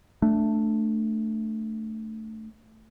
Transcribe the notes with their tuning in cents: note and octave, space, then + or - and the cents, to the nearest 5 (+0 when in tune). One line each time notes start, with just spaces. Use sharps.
A3 +0 D4 +0